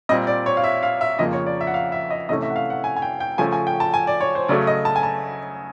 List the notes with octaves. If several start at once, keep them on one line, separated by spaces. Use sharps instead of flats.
A#2 G3 C4 D#5
D5
C#5
F5
E5
F5
E5
F2 C#3 F3 A#3 D#5
C#5
D5
E5
F#5
F5
E5
D#5
C3 E3 A3 C#4 D#5
E5
F#5
F5
F#5
G#5
G#5
G5
G5
C#3 F3 A3 C#4 G#5
G#5
G5
A5
G#5
D5
C#5
C5
C#3 F#3 A3 D5
D#5
A5
G#5
A5